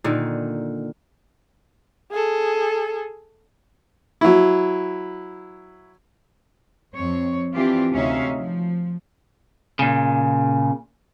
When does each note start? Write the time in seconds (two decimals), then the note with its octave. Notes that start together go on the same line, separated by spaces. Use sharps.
0.04 A#2 D3 D#3
2.12 G#4 A4
4.21 F#3 E4
6.94 F2 C4 C#5
7.55 E3 C4 D4 F4 G4
7.93 D2 C3 C#4 D#4 E5 F5
8.38 F3
9.79 A#2 C#3